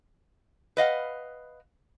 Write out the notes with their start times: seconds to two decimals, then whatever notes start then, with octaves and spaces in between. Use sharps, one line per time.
0.77 B4 D#5 F5 F#5